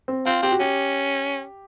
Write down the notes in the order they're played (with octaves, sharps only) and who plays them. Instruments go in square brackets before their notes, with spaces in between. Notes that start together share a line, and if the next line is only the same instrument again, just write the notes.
[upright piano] C4
[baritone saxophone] C4 [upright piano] F4
[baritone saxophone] C4 [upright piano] G4
[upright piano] F#4
[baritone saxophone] C#4 [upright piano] G4